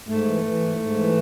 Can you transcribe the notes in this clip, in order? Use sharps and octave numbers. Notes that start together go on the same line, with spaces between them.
G#2 A3
E3
E3
G#2
G#2
E3